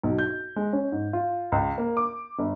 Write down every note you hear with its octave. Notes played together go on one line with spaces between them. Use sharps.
B1
G6
G#3
C#4
G#2
F4
C#2
A#3
D6
G1